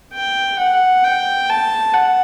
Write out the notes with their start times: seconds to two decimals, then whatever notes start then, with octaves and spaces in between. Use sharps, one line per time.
0.13 G5
0.59 F#5
1.04 G5
1.49 A5
1.94 F#5